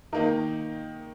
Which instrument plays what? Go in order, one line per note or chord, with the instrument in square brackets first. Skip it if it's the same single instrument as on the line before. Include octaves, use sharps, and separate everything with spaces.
[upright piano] D#3 A#3 D#4 A#4